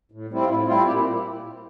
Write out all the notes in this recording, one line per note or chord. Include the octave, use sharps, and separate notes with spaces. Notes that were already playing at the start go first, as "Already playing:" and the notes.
A2
G3 C4 E4
F4
A2 E4
G3 C4 E4 F4
A#2 E4 G4